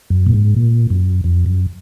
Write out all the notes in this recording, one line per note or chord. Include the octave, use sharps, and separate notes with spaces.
F#2
A#2
G#2
A#2
F#2
F2
F#2